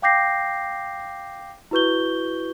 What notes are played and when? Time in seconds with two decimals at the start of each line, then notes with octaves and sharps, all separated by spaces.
0.02 F5 G5 D6 G6 A#6 C7
1.71 E4 F#4 B4 C#6 G6 G7